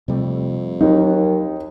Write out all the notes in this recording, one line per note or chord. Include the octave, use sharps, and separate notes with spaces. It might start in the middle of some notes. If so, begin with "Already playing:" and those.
F2 C3 G3 A3
D#2 F#3 D#4